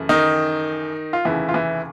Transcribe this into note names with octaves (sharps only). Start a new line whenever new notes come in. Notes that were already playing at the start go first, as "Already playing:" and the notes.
Already playing: F#2 C#3 E3 A3
D#3 D#4
F4
F1 D#2 C#3 E3 E4
F4
E3 E4